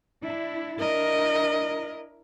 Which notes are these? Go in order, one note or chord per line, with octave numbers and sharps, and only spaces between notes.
D4 E4
D4 E4 A#4 D#5